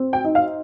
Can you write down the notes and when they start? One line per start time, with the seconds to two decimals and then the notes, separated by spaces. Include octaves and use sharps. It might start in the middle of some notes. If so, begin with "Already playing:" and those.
Already playing: C4
0.13 G5
0.24 D#4
0.35 F5